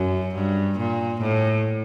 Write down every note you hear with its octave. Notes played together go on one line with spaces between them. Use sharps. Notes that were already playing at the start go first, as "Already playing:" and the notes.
Already playing: F#2
G2
A#2
A2